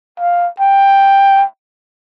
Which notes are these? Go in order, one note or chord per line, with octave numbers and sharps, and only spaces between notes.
F5
G5